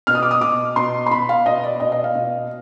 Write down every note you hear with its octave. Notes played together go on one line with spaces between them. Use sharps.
B2 F6
D#6
D6
D#6
B2 D6
B2 C6
C6
B2 B5
F5
B2 D#5
D5
B2 D#5
D#5
F5
B2